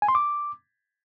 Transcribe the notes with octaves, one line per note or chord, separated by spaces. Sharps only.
G#5
C6
D6